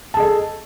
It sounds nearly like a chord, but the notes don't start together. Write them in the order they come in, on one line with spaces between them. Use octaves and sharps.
A5 G#4 D#5 A4